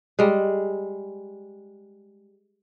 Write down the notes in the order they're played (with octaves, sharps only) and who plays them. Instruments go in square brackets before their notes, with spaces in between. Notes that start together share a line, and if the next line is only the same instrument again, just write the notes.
[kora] G3 G#3